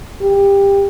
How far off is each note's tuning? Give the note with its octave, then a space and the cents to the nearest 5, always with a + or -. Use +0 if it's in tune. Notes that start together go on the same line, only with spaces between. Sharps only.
G4 +20